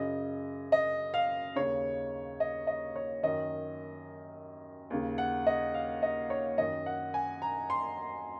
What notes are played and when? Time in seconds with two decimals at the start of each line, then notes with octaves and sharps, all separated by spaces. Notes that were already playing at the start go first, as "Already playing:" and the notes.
Already playing: F#2 C#3 D#5
0.72 D#5
1.14 F5
1.56 D#2 C#3 C#5
2.40 D#5
2.67 D#5
2.96 C#5
3.23 F#2 D#3 D#5
4.90 D#2 C#3
5.18 F#5
5.47 D#5
5.74 F5
6.02 D#5
6.30 C#5
6.58 F#2 D#3 D#5
6.86 F#5
7.14 G#5
7.42 A#5
7.70 C6